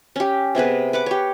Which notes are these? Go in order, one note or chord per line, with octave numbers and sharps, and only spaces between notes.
C#4 G4
C3 B3 G#4 B4
B4 F#5 D6
G4 C#5